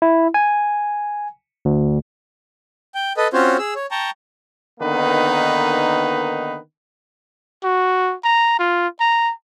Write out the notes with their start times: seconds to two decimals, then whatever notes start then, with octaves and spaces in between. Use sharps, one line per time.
0.02 E4
0.34 G#5
1.65 D2
2.95 G5
3.17 A4 B4 D#5
3.33 C4 C#4 F4 F#4 C5 C#5
3.59 G#4 E6
3.75 C#5
3.91 G5 A5 A#5 C#6
4.80 D3 D#3 A#3 B3 D#4 B4
7.64 F#4
8.24 A#5
8.59 F4
9.00 A#5